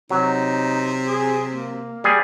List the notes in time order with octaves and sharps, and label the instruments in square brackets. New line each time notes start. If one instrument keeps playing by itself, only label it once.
[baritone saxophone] C3 [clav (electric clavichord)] F#3 [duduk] D#4
[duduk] G#4
A#3
[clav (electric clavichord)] G3 G#4